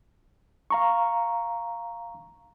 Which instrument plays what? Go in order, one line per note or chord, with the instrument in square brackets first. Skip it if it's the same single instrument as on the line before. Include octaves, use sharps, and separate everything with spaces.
[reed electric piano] F5 A#5 C#6